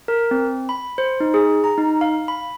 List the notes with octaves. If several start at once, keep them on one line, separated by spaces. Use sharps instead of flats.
A#4
C4
B5
C5
D#4
G#4
A#5
D#4
F5
B5